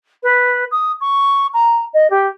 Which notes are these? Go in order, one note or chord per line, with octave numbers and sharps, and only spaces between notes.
B4
D#6
C#6
A#5
D#5
G4